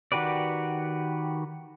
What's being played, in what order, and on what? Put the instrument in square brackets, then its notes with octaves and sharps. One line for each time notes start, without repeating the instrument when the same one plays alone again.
[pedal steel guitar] D#3 F#4 G4 B4 D5